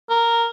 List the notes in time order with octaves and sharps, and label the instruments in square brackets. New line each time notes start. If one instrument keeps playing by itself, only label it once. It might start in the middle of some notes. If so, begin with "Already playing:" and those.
[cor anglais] A#4